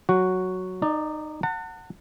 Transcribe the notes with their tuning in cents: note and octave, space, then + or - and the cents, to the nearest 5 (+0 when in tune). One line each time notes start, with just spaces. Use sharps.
F#3 +0 F#4 +0
D#4 -15 D5 +10
F#5 +0 A5 +45